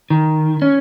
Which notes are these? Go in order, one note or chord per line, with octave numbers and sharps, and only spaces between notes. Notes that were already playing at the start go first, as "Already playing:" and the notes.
D#3
C#4